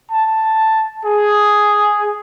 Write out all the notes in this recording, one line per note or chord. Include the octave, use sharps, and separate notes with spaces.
A5
G#4